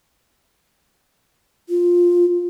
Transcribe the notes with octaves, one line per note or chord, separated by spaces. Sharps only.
F4